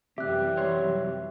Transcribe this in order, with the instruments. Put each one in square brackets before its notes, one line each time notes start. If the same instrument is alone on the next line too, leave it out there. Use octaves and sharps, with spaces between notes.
[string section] F#2 E3 G3 [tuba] C3 [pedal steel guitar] G4 [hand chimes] E5 F#6
[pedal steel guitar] F#3 C#5 C6